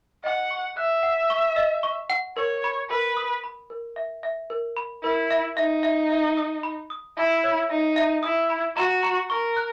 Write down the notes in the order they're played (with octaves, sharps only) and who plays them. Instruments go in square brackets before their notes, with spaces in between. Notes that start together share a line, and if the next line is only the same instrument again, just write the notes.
[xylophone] D#5 [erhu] F#5
[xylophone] C#6
[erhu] E5 [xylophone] F#6
[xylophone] F#5
C#6
D#5
C#6
F#5
[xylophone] A#4 [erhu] C#5
[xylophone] B5
[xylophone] A#4 [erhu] B4
[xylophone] D#6
B5
A#4
E5
E5
A#4
B5
[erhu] E4 [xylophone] A#4
[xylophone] E5
[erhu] D#4 [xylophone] E5
[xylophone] E5
E5
D#6
B5
D#6
[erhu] E4 [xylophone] E5
[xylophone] C#5
[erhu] D#4 [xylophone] E5
[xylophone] E5
[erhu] E4 [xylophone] D#6
[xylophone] B5
[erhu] F#4 [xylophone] A#5
[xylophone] A#5
[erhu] A#4 [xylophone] C#6
[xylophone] F#6